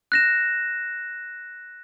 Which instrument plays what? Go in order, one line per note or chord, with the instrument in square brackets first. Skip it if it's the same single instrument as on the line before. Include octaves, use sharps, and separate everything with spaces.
[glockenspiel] F#6 A#6 E7